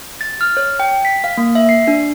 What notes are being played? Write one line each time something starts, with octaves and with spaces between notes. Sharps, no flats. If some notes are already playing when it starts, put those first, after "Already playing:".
A6
F6
C#5
G5
B6
F5
A#3
E5
C7
D4